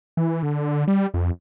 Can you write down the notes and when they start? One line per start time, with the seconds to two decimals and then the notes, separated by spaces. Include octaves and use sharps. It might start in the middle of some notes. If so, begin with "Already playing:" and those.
0.17 E3
0.43 D3
0.88 G3
1.14 F2